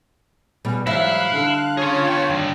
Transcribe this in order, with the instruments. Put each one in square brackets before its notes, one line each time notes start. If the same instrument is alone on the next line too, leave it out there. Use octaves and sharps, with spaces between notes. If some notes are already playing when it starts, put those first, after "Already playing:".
[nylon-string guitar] B2 G#4 [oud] G3
[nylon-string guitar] G#2 E3 F#3 [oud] G3 E5 [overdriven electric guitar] E4 [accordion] F5 F#6
[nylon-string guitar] D3
[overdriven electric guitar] C#4 G#4 [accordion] F4 C#5
[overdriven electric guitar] B3 G5
G2 D#3